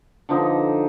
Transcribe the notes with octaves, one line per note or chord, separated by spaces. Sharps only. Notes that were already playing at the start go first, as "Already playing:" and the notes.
D3 F3 D#4